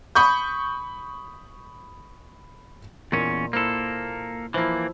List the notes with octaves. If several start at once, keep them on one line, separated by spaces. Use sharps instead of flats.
B5 C#6 D#6 G6
E2 A#2 C#4 D#4
A#3 E4 A4 C5
E3 F3 A#3 E4